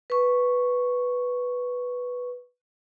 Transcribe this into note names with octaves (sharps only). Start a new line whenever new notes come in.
B4 C#6